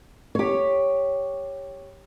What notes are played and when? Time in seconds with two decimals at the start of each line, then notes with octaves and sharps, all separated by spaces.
0.35 G4 C#5